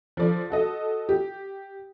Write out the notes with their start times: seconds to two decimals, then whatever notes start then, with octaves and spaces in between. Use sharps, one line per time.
0.17 F3 A4 D5
0.50 F#4 A4 D#5
1.09 G4